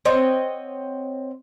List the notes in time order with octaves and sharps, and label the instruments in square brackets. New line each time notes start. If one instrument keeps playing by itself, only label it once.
[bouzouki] C4 C#5 D#5 F#5